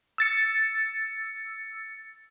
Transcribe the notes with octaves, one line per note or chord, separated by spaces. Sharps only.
E6 A6 C#7